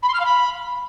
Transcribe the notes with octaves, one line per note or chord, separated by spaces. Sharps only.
B5
C6
F6
F5
B5